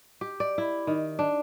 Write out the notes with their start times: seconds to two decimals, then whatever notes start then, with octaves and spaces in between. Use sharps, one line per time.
0.21 G4
0.40 D5
0.58 E4
0.87 D#3
1.19 D4